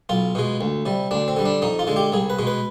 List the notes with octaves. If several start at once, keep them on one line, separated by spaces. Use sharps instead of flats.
B1 F4
B2 G#3
D2
C3 G3
D2 D4
C4
D3 G3
D4
F2 D#4
F4
D3 G#3
G4
C2 G#4
B4
B2 G#3
B4